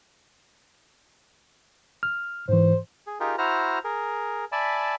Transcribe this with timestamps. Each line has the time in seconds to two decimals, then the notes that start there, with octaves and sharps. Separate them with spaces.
2.03 F6
2.49 G#2 E3 C5
3.07 G#4
3.20 D#4 F4 G4 G#4 A#4
3.38 E4 F#4 C5 A#5 F6
3.84 G#4 A#4
4.52 D5 E5 G#5 A5 B5